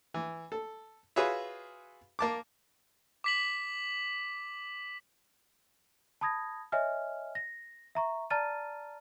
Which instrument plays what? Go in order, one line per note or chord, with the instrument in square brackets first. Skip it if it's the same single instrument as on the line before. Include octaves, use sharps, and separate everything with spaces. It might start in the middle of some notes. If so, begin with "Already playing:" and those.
[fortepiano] E3
A4
F4 F#4 G#4 B4 C#5 E5
A#3 A5 D6
[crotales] D6 B6 F#7
[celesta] A5 B5 D#6 G#6 A#6
C#5 D#5 E5 G#5 F6
A#6
E5 A#5 C#6
D5 A5 A#5 F6 A6 D#7